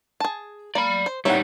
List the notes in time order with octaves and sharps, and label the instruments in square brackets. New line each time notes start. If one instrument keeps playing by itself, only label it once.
[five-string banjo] G#4 A5
[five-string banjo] A#3 [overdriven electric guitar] D5 B5
[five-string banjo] C5
[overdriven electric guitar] G3 D#4 [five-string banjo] A#3 C4 E4 [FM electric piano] C#5 F#5